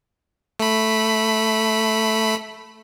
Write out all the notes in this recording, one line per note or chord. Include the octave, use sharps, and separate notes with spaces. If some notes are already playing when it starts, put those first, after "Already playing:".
A3 B5